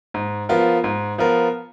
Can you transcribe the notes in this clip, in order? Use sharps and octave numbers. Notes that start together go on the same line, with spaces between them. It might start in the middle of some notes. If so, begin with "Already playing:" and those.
G#2
F3 B3 F4 A#4
G#2
F3 B3 F4 A#4